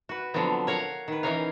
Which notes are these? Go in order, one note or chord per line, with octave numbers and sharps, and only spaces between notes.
F#4 B4
D3 F3 F#3 B3 C4
A#4 C#5 F5 F#5 A#5
D#3 B4
E3 C#4 D#4 A#4 C#5 F5